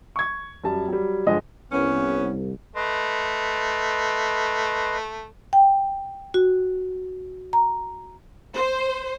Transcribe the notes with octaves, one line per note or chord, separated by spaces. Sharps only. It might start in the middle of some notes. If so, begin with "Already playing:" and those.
C#6 G#6
F#2 G3 A5
F#3 G3
G1 F3 G#3 D#5
C2 B3 C#4
A3 B4 D#5 C6
G5
F#4
A#5
C5